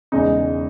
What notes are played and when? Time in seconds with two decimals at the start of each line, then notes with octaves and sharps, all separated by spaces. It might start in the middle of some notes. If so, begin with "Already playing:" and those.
0.12 E1 E2 C#3 G#3 D#4